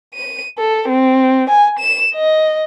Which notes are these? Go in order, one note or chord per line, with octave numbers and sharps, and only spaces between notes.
D#7
A4
C4
G#5
E7
D#5